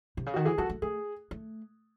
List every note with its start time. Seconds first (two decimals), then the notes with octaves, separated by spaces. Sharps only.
0.17 C3
0.26 C#3
0.34 D#3 F#4
0.45 E3 G#4
0.58 G#3 F#4 A4
0.70 A3
0.82 A3 G#4
1.31 A3